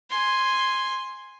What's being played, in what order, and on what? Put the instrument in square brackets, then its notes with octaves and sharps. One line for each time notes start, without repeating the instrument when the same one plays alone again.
[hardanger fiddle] G#5 C6